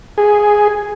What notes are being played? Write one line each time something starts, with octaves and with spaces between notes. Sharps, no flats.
G#4